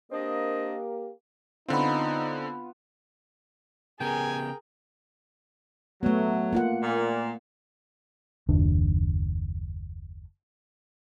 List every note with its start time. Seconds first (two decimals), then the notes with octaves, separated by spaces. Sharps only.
0.12 A#3 C4 D4 G4 A#4 D#5
1.68 D3 B3 C4 D#4 F4
4.00 C#3 B3 G4 G#4 A#4 G5 G#5
6.03 F#3 A3 B3
6.53 A#3 F4 F#5
6.82 A#2
8.49 F#1 D#2 D4